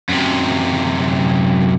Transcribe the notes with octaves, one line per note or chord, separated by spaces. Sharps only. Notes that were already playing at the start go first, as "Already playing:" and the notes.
F#2 C3